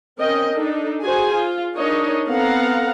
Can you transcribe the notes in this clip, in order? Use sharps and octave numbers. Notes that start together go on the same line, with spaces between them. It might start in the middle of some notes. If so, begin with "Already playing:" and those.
C4 C#4 A#4 D#5 G5
D4 D#4 A4
F#4 G#4 C5 G#5
F4
D4 D#4 G#4 A#4 C#5 D#5
B3 C4 A4 F5 F#5 A#5